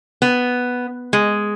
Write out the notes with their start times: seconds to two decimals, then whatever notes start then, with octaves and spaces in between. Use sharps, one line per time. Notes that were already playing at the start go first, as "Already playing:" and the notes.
0.22 B3
1.13 G#3